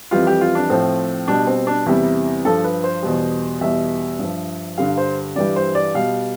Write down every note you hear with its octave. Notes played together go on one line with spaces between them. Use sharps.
F2 E3 G3 F4
G4
F4
D4
A2 F3 C4
B2 G3 D4
C4
D4
E2 C3 G3 E4
G2 F3 A4
B4
C5
E2 B2 G3
E2 B2 G3 E5
G2
F3
G2 D3 G3 F5
C5
G2 E3 G3 D5
C5
D5
B2 G3 F5